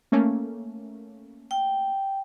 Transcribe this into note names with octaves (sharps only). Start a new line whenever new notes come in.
A3 A#3 C#4
G5